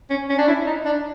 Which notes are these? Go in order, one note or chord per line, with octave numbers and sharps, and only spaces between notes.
C#4
C#4
D4
E4
D#4
D4